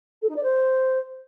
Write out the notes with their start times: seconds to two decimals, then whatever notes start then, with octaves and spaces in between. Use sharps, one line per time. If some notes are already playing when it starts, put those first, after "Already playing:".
0.22 A4
0.29 D#4
0.36 D5
0.43 C5